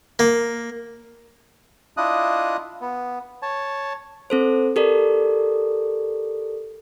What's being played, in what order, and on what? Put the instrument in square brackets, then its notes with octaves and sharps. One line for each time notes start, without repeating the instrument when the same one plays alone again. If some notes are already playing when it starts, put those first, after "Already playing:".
[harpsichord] A#3
[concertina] D4 E4 F4 D#5 D#6 F#6
B3
C#5 A5
[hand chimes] C4 A4 C5
G4 A4 A#4 D5